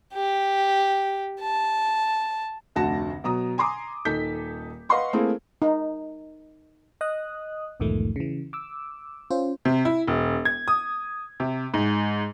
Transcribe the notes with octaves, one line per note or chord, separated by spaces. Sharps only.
G4
A5
F1 D2 D3 F#4 A5 A#6
B2 F#3 A#5 D#6
G#5 A#5 C6 D6 D#6
D#1 D#4 A4 G6 B6
B4 D#5 F5 F#5 C6 C#6
A3 A#3 C4 E4 G#4
D#4
D#5 D#6 F#6
B1 E2 G#2 D#3 F3 A3
C#3 E3
D6 E6
C#4 F4 C5
C3
E4
E1
G#6
D#6
C3
G#2